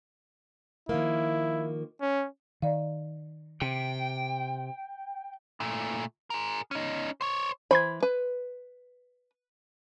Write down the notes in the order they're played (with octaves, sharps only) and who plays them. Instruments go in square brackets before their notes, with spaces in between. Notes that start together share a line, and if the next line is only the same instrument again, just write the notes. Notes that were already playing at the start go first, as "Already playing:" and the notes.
[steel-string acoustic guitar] D#3 F3 A#3 [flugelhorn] E4
[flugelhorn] C#4
[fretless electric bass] D#3 [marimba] D5 F5
[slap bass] C3 [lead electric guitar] G5
[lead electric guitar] A#2 A3
G#4 A#4
C#4 D#4
C5 C#5
[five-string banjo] E3 B5 [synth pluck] C5 C6 G#6
[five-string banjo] B4